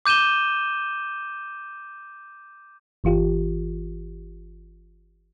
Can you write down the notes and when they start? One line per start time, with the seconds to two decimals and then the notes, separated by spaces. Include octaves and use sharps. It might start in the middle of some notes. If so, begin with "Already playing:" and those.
0.06 D6 G6 D#7 E7 G7
3.04 G1 E3 F4 G4